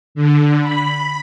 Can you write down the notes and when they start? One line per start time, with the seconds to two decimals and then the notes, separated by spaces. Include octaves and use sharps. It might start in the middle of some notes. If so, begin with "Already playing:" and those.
0.15 D3
0.62 B5